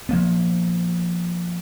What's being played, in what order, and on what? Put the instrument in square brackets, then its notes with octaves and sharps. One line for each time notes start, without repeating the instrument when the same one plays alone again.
[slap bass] F3 A#3 B3